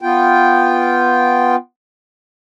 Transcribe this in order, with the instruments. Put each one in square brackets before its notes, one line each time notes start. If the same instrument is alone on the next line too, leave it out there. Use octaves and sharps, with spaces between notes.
[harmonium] B3 F4 G5